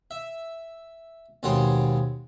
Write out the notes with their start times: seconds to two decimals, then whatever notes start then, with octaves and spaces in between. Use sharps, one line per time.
0.11 E5
1.43 D#2 B2 G#3 C4 C#5